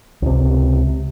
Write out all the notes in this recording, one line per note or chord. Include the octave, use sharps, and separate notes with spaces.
C#2 C3